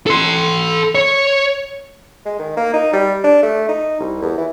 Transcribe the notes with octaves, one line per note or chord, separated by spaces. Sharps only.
A4 C6
C#5
G#3
D#3
A#3
D#4
G3
D4
A3
D#4
C2
E2
E3